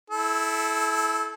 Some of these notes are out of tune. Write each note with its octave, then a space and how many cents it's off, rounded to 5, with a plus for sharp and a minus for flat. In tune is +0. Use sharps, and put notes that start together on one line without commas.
E4 -5 A4 -30